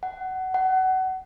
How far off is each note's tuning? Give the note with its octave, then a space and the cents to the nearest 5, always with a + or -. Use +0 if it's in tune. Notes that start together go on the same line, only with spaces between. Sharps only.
F#5 +20
F#5 +25